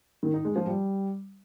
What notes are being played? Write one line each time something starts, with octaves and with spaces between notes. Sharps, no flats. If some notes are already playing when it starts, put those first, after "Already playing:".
D#3
D#4
G#3
F3
G3